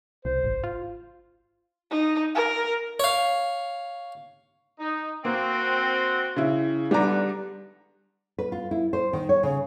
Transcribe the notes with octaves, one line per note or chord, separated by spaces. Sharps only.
C2 C5
G#1
F4
D#4
A#4
C#5 F5
D#4
A#3 C4 F#4
C#3 E4
E2 D3 G3 B3 D4 A#5
B4
F4
E4
C5
D#3
C#5
C#3